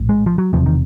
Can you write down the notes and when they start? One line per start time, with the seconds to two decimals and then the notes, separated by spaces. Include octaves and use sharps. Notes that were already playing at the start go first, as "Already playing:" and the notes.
Already playing: A#1 A2
0.09 G#3
0.26 F3
0.38 F#3
0.53 E1 E2 C3 F3
0.66 D#3